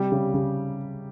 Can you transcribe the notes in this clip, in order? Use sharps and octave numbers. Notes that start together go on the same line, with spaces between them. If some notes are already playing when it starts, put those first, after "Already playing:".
Already playing: C3 G3 G4
C#3
C#3